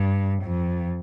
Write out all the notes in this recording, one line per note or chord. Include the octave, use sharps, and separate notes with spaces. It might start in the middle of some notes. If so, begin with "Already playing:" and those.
Already playing: G2
F2